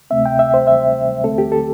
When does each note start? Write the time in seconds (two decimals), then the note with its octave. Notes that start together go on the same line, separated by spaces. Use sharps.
0.10 D2 C3 A3 C4 E5
0.26 G5
0.39 E5
0.54 C5
0.67 E5
1.24 D2 D3 A3 C4 A4
1.38 G4
1.52 A4